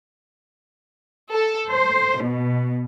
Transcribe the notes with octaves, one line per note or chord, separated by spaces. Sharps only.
A4
C5
B2